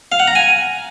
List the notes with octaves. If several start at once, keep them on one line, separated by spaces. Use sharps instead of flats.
F5
F#5
A#5
G#5